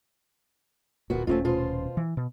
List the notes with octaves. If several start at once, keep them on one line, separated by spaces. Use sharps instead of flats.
D1 A#2 A#3 B3 F#4
D#1 C3 A3 C4 C#4 F4
B2 F4 C5
E3
B2